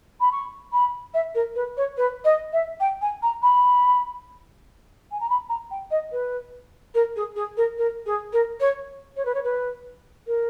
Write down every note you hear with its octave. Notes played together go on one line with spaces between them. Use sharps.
B5
C#6
B5
E5
A#4
B4
C#5
B4
D#5
E5
G5
G#5
A#5
B5
G#5
A#5
B5
A#5
G5
D#5
B4
A#4
G#4
G#4
A#4
A#4
G#4
A#4
C#5
C#5
B4
C#5
B4
A#4